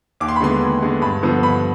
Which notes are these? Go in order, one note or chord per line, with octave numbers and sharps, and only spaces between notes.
D#2 D6
C6
B5
D3 G#3 B3 C6
D#2
D3 G#3 B3
G2 B5
D3 F3 B3
G2 B5